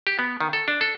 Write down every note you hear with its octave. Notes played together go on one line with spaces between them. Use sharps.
G4
B3
D#3
A4
D4
A4